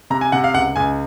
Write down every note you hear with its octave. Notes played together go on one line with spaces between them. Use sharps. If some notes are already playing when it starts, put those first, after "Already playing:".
C3 A#5
G#5
C3 F#5
F5
C#2 F#5
C#2 G#5